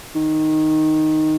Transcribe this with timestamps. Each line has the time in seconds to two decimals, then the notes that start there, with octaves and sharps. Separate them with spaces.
0.15 D#3